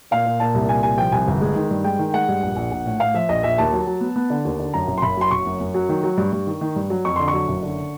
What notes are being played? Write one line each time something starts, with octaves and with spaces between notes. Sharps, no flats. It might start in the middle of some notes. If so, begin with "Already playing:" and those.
A#2 F5
A#2
A#2 A5
C2
A#2 G#5
C2 G#5
F3 G5
C2 G#5
G1
G#3
D#3
G2
G#3 G5
D#3
G#3 F#5
G2
A#1
A#1
A#1
A2
A2 F5
F3 E5
A#1 D#5
A#1 E5
D#2 A5
F#3
F#3
B3
B3
D3
D#2
D3
F#2 A#5
F#1
C6
F#1 B5
F#3 C6
F#1 C#6
F#2
F#2
F#3
D#3
F#3
G2
G2
D#3
D#3
G2
F#3
F2 C#6
D3 C6
C#6
F#3
F#1
D3